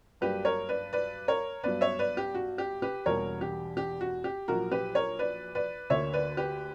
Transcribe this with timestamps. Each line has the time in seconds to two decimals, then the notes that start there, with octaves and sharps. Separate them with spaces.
0.21 G2 F#3 A#3 D4 G4 B4
0.45 A#4 C#5
0.69 B4 D5
0.93 B4 D5
1.28 A#4 C#5
1.64 G2 F#3 B3 D4 B4 D5
1.81 C#5 E5
1.99 B4 D5
2.17 G4
2.35 F#4
2.58 G4
2.82 G4 B4
3.06 E1 E2 B2 G3 A#3 A#4 C#5
3.41 G4
3.77 G4
4.01 F#4
4.24 G4
4.48 A#1 A#2 F#3 F#4 A#4
4.71 G4 B4
4.95 A#4 C#5
5.19 B4 D5
5.55 B4 D5
5.90 D2 D3 A#3 C#5 E5
6.13 B4 D5
6.37 G4 B4